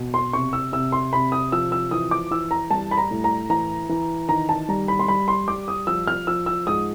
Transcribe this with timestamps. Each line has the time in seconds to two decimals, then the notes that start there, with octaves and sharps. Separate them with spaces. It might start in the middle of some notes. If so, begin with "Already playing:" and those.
Already playing: B2
0.14 C6
0.33 C3 C#6
0.53 E6
0.72 C3 E6
0.92 C6
1.13 C3 B5
1.32 D#6
1.52 F3 E6
1.72 E6
1.91 E3 D#6
2.11 D6
2.31 E3 E6
2.51 A#5
2.71 G3 A5
2.91 B5
2.98 A#5
3.11 A2
3.24 A#5
3.50 E3 A#5
3.89 E3
4.29 D#3 A#5
4.49 A5
4.69 G3 A#5
4.88 B5
4.99 C6
5.08 G3 B5
5.28 C6
5.48 G3 D6
5.68 D#6
5.87 F3 E6
6.07 F6
6.27 F3 E6
6.46 E6
6.66 G#2 D#6